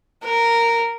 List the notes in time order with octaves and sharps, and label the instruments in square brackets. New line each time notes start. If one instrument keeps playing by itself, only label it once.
[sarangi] A#4